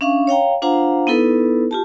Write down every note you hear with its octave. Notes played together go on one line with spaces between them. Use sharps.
C#4 D4 E5 F5 C#6
C#5 F5 G5 A#5
D4 F4 C5 F5 F#5 A#5
B3 D#4 E4 A4 B4
F4 G4 A5